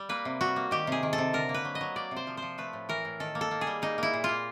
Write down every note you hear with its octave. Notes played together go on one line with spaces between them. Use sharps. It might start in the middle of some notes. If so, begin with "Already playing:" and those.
Already playing: G3
A#3 B4
C3
G3 F#4
A#3
D#3 G4
C3 G#4
D#3
A4
C3
D3 A#4
A#3
B4
F#3
D#5
F#3
A#3 D5
C3
C5
F3
F3 C5
A3 B4
A2
E3 A#4
A2
D#3 A4
A#3
A4
A#3
G#4
G3
A#3 D#4
A#3 E4
A#2
A#3 F4